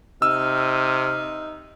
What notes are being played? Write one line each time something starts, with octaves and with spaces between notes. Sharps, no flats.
C3 D#4 E6 F6